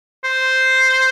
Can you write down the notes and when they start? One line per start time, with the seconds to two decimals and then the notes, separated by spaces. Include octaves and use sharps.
0.24 C5